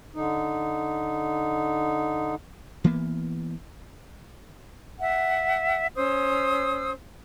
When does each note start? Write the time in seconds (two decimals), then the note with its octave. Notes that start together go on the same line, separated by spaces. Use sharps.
0.15 D3 D#4
2.84 E3 A#3 B3
4.99 E5 F#5
5.96 C#4 C5 D#6 E6